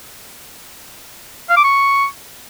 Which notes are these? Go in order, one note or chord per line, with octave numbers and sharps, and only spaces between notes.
F5
D6
C#6